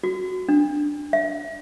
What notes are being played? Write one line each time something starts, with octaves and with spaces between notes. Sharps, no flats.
F#4
D4
E5